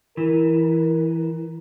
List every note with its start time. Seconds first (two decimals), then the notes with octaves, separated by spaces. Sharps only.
0.17 E3 A#4